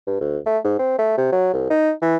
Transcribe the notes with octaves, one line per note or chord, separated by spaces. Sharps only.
G2
D2
A3
G#2
C4
A3
C3
F#3
C2
D#4
E3